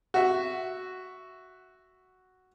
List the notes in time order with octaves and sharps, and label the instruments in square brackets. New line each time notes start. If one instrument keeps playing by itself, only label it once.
[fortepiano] F#4 E5